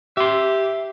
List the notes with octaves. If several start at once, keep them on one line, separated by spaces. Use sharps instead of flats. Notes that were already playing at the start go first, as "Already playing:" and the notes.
G4 E5 C6